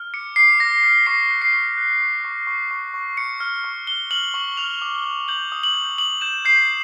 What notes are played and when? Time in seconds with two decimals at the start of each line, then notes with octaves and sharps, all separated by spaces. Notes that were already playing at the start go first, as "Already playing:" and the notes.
Already playing: F6
0.14 D6 C#7
0.36 D6 C7
0.60 F6 A#6
0.83 F6 B6
1.06 C#6 C7
1.31 F#6
1.42 C7
1.53 C#6
1.77 F#6
2.00 C#6
2.24 C#6
2.47 C#6
2.71 C#6
2.94 C#6
3.17 C#6 C#7
3.40 F6
3.64 C#6
3.87 F6 G7
4.11 F6 F#7
4.34 C#6 F#7
4.57 F6 F7
4.82 D6
5.04 F6
5.28 G6 F#7
5.52 D#6
5.63 F#7
5.74 G6
5.98 D#6 F#7
6.21 G6 E7
6.45 G6 C7